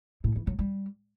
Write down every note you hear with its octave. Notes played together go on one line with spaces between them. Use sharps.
A2
E3
F#3
G3